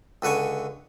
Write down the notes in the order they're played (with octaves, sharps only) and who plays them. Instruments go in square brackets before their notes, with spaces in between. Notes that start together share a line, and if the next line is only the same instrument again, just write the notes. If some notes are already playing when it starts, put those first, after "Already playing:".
[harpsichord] C#2 D3 B4 C#5 G#5